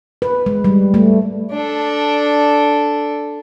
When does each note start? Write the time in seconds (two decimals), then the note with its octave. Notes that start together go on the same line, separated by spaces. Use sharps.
0.22 B4
0.46 G#3
0.64 G3
0.94 A3
1.51 D4 A4